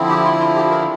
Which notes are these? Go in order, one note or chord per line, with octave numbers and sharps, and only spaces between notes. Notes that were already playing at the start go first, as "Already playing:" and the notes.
Already playing: D3 F3 C4 E4
G4
F4
F4
G4
A#4